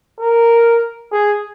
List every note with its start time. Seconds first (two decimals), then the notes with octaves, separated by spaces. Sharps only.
0.20 A#4
1.12 G#4